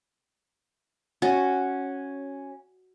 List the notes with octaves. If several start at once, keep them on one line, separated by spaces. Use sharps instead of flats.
C#4 F#4